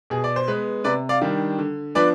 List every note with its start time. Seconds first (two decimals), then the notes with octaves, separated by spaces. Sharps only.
0.10 B2 G#4
0.24 D5
0.36 C5
0.48 G#3 B3 B4
0.84 C3 B4 D5
1.09 D5 F5
1.21 D#3 G3 D4
1.58 D3
1.95 F3 B3 D4 B4 D5